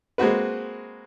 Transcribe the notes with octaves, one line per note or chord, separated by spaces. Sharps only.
G#3 A#3 C4 F#4 B4